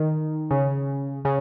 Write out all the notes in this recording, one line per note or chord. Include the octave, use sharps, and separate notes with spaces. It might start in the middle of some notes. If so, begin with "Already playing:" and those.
Already playing: D#3
C#3
C#3